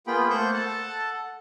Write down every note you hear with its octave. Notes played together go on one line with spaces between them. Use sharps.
A#3 B3 F4 G#4 G5 B5
A3 A#3 C5 C#6 F#6 G6
A4 F#5 A5